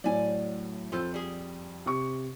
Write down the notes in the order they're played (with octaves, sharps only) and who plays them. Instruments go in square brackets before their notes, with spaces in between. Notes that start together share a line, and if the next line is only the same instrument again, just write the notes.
[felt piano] A2 F#3 [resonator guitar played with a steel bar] D5 G#5
[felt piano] F2 [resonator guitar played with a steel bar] F4 A4 C5
[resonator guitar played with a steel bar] G3 G#4
[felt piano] C3 C#6